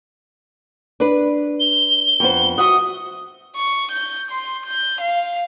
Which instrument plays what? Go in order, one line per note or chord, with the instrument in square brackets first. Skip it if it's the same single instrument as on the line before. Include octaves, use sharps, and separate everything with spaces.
[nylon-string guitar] D4 B4
[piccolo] G7
[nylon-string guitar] F2 B3 C5
[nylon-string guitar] F#4 E5 F#5 [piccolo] D#6
[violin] C#6
G6
C6
G6
F5